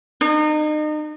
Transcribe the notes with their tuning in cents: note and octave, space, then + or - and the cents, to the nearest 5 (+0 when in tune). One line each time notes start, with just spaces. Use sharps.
D#4 -35